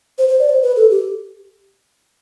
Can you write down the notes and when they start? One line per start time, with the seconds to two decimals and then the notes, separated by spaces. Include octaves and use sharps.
0.18 C5
0.29 C5
0.39 D5
0.49 C5
0.62 B4
0.76 A4
0.90 G4